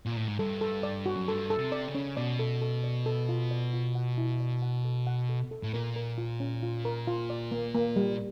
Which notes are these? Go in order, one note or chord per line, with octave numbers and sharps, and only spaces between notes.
A#2
A2
G#2
G2 A4
A4
D5
F#4
F#2
G2 A4
A4
C3
D5
C#3
C#4
B2 D5
A4
A4
D5
A4
F4
D5
F4
F#5
E4
D5
F#5
A4
F#5
A4
A4
A2
A#2 A#4
A#4
F4
C#4
F4
A#4
F4
D5
A#3
A#3
G3